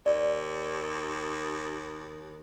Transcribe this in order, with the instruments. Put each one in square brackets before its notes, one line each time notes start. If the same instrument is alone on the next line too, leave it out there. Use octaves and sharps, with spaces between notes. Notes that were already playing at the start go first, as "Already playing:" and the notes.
[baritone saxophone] D#2 [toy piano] D5